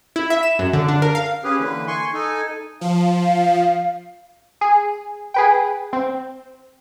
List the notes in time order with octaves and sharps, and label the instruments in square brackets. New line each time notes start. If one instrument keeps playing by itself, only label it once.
[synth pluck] E4
E5
E7
F#2
D3
D4
A#4
F5
[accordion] C#4 G4 G#4 B4
D3 E3 A#3 B4
G#5 C6 C#6
D#4 A4 G#5
[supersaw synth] F3 [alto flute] F5
[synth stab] G#4
G#4 B4 G5
C4